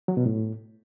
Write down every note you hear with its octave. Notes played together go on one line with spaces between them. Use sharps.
F#3
B2
A2